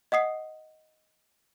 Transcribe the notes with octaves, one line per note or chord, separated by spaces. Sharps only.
D#5 F#5 D#6 C7